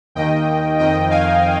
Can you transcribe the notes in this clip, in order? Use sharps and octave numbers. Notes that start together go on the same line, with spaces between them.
D#2 D#3 D#5 G5
F2 D#3 D#5 G5
F5 G#5